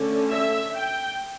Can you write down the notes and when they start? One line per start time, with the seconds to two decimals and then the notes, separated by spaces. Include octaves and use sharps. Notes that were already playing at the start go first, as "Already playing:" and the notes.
Already playing: D3 A3 C#4
0.29 E5
0.75 G5